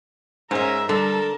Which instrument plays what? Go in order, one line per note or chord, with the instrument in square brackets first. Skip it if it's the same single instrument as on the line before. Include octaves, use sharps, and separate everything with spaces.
[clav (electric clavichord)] G#2 [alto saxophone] C#4 [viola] A#4 E5 [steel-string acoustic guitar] C5 D#5
[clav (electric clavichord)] D3 [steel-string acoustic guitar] G3 [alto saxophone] A4 [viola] A#4 A5